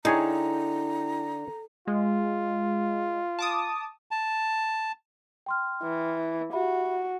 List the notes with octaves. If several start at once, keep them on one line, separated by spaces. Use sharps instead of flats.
D3 D#4 E4 G#4 C#5 G5 A#5
G#3 F4
A5 D6 D#6
A5
G5 C6 F6
E3
F#4 G4 E5 B5